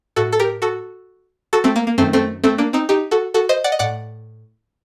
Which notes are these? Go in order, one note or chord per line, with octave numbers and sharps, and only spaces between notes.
A2 F#4 A4
A4
G4 A#4
F#4 A4
F#4 A4
A3 C4
A#3
A#3
F#2 D#3 A3 C4
A3 C4
A3 C4
A#3 D4
C4 D#4
D#4 G4
F#4 A4
F#4 A4
C5 D#5
D5 F#5
D#5
A2 D5 F#5